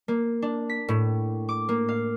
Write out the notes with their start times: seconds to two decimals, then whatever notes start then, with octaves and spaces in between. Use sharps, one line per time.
0.08 A#3
0.42 D4
0.69 B6
0.88 A2
1.49 D6
1.69 A#3
1.89 F5